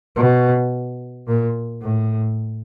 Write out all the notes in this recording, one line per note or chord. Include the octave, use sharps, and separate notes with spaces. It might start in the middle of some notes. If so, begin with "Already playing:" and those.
B2
A#2
A2